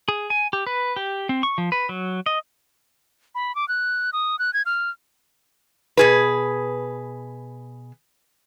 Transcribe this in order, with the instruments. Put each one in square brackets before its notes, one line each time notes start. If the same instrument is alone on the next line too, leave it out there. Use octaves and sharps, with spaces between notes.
[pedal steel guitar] G#4
G#5
G4
B4
G4
C4
C#6
F3
B4
F#3
D#5
[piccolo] B5
D6
F#6
D#6
F#6
G#6
F6
[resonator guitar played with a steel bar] B2 G#4 B4